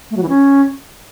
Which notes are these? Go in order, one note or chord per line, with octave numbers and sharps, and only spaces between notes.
A3
F#3
E3
C#4